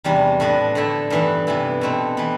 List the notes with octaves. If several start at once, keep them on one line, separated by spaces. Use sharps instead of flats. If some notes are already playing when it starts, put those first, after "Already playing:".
E2 C3 G3 D4
A2 F3 B3 D4
D3 A3 E4
G2 E3 B3 E4
C3 E3 B3 E4
B2 A3 C4 E4
E3 B3